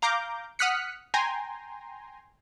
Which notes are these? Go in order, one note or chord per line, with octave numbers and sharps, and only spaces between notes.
F5 A#5 D6 G6
F#5 D#6 F6 F#6 B6 C#7
G5 G#5 A#5 C6